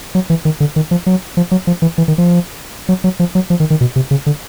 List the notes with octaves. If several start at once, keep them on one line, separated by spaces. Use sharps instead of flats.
F#3
E3
D#3
D3
D#3
F3
F#3
F3
F#3
F3
E3
E3
D#3
F3
F#3
F#3
F3
F#3
F3
D#3
D#3
B2
C3
C#3
D3